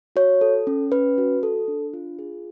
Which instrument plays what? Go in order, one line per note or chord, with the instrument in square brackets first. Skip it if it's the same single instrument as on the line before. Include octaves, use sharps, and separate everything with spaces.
[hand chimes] F#4 C#5
A4
C#4
C#4 B4
F#4
A4
D4
F4
G#4